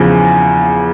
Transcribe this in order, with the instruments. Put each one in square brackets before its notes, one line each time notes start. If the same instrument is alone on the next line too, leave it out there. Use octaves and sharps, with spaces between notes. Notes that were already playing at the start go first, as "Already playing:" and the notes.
Already playing: [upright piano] E2 C#3 F3